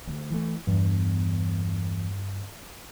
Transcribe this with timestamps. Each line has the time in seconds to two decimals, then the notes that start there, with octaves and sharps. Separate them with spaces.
0.07 D2
0.30 E3 A3
0.67 E2 G2